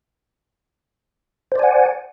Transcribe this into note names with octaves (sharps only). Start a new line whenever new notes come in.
C5 D5 F#5 G#5